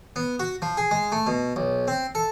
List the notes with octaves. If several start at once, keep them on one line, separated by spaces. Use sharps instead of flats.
B3
F#4
F3
G#4
G#3
A3
B2
B1
C4
A4